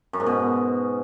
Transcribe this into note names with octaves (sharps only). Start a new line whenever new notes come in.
F#2
G#2
B2